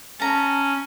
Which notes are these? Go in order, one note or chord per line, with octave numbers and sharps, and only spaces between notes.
C#4 A5 A#5